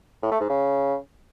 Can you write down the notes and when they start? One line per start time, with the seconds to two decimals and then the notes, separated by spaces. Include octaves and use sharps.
0.23 A2
0.32 A3
0.41 G#2
0.50 C#3